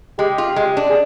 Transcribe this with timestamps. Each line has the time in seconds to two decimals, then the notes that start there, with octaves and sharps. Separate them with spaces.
0.18 G#3 G4
0.38 F4
0.56 G#3
0.77 D4
0.89 G#4